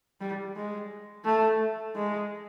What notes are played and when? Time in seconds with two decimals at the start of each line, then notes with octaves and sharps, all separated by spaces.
0.21 G3
0.56 G#3
1.25 A3
1.95 G#3